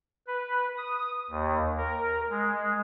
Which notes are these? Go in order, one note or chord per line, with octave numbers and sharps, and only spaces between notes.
B4
D#6
D#2
A#4
G#3